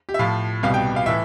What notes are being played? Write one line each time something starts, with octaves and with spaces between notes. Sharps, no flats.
G4
E5
A2 F3 F5
C2 B2 G3 F5
G5
F5
A2 E3 E5